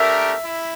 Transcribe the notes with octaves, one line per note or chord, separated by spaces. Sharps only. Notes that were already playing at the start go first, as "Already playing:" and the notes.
Already playing: A3 D4 G4 A#4 E5
E4